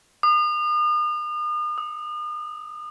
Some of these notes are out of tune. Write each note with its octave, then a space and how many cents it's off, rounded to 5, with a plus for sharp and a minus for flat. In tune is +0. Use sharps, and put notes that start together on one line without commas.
D#6 -40
D#6 +25